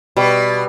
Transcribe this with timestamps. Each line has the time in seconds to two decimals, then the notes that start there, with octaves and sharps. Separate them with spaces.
0.17 B2 G3